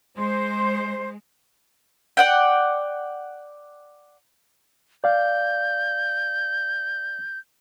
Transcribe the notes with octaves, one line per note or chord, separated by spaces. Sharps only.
G#3 C5
D5 F#5 G5
D5 F5 G6